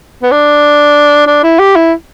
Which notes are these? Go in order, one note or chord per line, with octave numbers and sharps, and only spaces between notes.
B3
D4
D4
E4
G4
E4